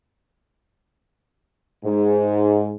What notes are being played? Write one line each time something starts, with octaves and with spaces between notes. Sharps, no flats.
G#2